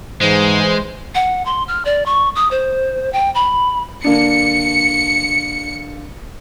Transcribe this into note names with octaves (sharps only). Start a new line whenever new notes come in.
G#2 E3 G#3 C5
F#5
C6
F6
D5
C#6
D#6
C5
G5
B5
D3 A#3 D4 C#7